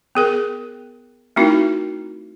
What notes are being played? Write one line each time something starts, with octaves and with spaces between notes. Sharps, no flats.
B3 G#4 A#4
A3 C4 D#4 E4 F#4 A#4